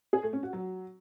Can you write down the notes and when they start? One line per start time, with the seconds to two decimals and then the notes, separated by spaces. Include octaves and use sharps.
0.13 G#4
0.23 A3
0.33 C#4
0.43 F#4
0.53 F#3